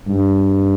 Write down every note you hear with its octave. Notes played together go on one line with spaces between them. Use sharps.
G2